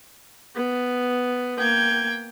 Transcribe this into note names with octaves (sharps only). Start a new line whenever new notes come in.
B3
A#3 G5 G#6